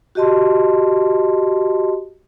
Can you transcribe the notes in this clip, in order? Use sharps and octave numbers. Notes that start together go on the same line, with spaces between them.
F#4 G4 D#5 A5 C6